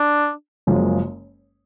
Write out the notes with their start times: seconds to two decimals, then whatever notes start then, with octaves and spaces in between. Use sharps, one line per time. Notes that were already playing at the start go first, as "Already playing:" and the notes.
Already playing: D4
0.67 F#1 F#2 C#3 F3 G#3